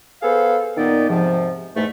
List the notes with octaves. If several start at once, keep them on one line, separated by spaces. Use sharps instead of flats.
B3 G#4 A4 C5 F5
A#2 D#3 B3 D#4 D5
G#2 C3 F3
E2 G#2 A3